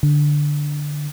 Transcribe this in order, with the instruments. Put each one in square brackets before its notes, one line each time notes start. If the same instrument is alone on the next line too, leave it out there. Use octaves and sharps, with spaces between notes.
[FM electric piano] D3